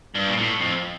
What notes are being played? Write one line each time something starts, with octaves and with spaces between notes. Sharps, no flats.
G2
A#2
A2
F2